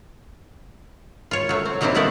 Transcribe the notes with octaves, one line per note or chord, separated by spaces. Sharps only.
F4 C#5
F#3 A3
C4
D#3 F#3 A#3 C4 D4 E4
F3 A3 B3 E4 D5 D#5